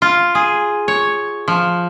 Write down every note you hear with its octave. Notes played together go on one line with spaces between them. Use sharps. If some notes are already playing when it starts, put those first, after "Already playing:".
F4
G#4
C#5
F3